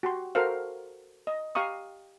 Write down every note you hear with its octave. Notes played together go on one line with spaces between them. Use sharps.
F#4 G4 C6
F#4 A4 A#4 C5 F5
D#5
G4 F5 A#5 C#6 D#6